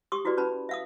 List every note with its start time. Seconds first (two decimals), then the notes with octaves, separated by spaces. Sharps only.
0.12 G4 C6 C#6 D#6
0.25 E4 F#4 G4 B4 D5
0.37 C#4 B4 A5 B5
0.69 E5 F5 D#6